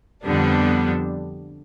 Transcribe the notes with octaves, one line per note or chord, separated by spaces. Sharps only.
F2 D3 G3 B3 D4